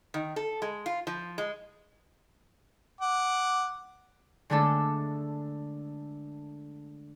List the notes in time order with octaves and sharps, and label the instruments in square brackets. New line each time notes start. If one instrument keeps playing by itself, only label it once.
[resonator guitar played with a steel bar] D#3
A4
G#3
F4
F3
G#3
[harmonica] F#5 D6
[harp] D3 G#3 A3 D4 A4